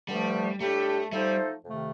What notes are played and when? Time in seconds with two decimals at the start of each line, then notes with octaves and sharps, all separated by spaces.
0.08 G2 D3 F3 G3 A3
0.60 A2 G3 A3 D4 G4
1.12 F3 G3 A3 D#4 A4 C5
1.64 F2 C3 D#3 A3